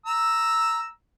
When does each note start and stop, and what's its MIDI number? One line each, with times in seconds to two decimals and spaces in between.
0.06 0.87 82
0.06 0.87 88